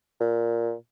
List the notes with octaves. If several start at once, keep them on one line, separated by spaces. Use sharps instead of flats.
A#2